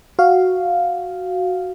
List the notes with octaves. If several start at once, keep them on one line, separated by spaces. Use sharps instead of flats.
F#4 F5